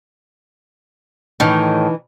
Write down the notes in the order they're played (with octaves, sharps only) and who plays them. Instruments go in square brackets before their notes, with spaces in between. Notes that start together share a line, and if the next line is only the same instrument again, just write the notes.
[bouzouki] A2 D#3 [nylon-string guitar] E3 D#4